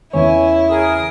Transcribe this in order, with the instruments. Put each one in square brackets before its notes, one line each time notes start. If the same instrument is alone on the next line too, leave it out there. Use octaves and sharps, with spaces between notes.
[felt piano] E2 C#3 [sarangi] E4 [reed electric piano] C#5 [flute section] G#5
[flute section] G#4 A#4 D#6